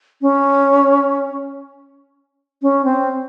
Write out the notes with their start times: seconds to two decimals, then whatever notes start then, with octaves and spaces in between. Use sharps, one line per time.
0.21 C#4
2.62 C#4
2.85 C4